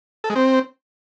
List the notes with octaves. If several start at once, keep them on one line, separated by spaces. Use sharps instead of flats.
A4
G#3
C4